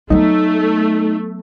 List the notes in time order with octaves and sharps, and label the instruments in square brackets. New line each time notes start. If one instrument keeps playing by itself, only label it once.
[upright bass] F#3 B3 [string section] A3 [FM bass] D#4